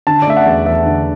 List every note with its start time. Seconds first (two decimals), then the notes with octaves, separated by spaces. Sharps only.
0.07 D3 A5
0.22 D5
0.27 A3 E5
0.37 F#5
0.46 E2
0.66 E2 E5
0.86 D3